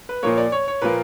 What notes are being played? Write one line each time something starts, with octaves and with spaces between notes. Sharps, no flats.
B4
A#2 F3 A#3 C#5
D5
C#5
C#5
A#2 F3 A#3 B4